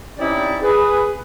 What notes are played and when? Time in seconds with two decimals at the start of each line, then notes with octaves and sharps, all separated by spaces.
0.18 C4 C#4 D#4 E4 G4 D5
0.62 G#4 B4